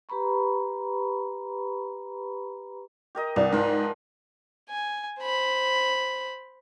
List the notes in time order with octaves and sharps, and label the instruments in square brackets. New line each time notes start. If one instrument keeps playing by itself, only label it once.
[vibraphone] G4 B4 A#5 B5 C#6
[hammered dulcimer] G4 A#4 D#5
[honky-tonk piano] C2 [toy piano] B4 D5 E5
[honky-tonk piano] G#2 [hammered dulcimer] F3 A#4
[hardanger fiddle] G#5
C5 B5